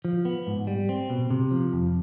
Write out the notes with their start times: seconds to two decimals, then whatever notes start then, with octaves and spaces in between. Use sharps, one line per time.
0.05 F3
0.25 B3
0.47 G#2
0.67 G3
0.89 C4
1.10 B2
1.30 C3
1.51 F3
1.73 F2